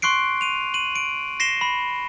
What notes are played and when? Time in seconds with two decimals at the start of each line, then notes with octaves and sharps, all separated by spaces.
0.02 C6 C#6 F#6 C7 D7
0.41 D#7 F7
0.74 D#7 F#7
0.96 D7
1.40 A#6 C7 E7 G7
1.61 B5